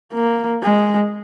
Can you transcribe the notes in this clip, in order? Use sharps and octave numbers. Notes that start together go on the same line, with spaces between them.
A#3
G#3